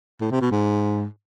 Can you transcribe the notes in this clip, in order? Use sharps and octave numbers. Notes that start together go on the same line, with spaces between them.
A2
C3
B2
G#2